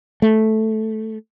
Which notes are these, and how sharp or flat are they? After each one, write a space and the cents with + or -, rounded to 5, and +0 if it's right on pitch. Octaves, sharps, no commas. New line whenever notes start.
A3 -5